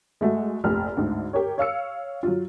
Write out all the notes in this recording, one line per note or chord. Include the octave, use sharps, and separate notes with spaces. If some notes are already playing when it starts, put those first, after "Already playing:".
G#3 A3 F#4
F1 A#1 F6
D2 G#2 D3
G4 A#4 C#5
C#5 F5 E6 C#7
F#3 F4